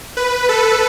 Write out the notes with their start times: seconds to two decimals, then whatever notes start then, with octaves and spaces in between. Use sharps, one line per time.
0.17 B4
0.49 A4